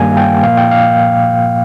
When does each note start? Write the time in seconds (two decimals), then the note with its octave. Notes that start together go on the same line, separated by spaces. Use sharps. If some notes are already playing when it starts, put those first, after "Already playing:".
Already playing: G2 D#3 G3 A#3 G#5
0.12 F5
0.17 G5
0.43 A#2 F3 A#3 F5
0.57 G5
0.71 F5